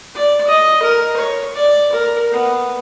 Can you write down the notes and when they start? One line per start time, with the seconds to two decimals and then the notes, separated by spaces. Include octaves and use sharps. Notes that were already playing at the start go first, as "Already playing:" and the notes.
0.15 D5
0.47 D#5
0.83 A#4
1.17 C#5
1.54 D5
1.93 A#4
2.32 B3